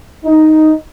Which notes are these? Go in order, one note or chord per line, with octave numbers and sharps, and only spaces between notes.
D#4